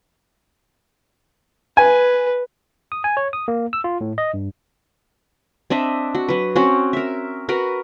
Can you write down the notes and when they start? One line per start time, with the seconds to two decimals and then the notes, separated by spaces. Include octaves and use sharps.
1.77 B4 G#5
2.92 D#6
3.04 G#5
3.17 C#5
3.33 D#6
3.48 A#3
3.73 E6
3.84 F4
4.01 A2
4.18 D#5
4.34 G2
5.70 C4 D4 D#5 E5
6.15 F#4
6.28 F#3 B4
6.56 C4 C#4 F#4
6.93 A#4 E5
7.49 F#4 A#4 B4